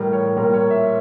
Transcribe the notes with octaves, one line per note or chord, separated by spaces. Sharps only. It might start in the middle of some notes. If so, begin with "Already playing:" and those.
Already playing: A2 E3 G3 A#4
C#5
A#2 G3 A#4
C#5
E5